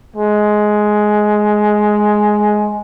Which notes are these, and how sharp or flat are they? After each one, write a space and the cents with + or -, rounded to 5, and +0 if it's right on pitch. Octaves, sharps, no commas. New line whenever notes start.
G#3 +10